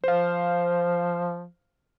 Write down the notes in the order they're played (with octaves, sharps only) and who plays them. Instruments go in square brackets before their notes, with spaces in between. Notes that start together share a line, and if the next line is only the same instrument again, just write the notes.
[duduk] F3 [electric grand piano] C5 F5